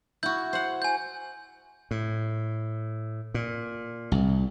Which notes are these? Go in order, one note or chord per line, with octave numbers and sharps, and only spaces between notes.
E4 F#4 G6
C5 F#5
G#5 G6
A2
A#2
C2